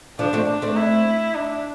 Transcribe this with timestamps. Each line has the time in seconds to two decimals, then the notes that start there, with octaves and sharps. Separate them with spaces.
0.19 D3 F3 D4
0.33 A3 C4
0.48 D4
0.62 A3 C4
0.76 E4
1.34 D4